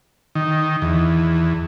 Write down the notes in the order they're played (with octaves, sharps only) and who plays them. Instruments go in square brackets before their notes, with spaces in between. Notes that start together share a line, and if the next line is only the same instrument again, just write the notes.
[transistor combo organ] D#3
E2